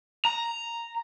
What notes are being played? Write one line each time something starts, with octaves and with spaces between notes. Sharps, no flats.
A#5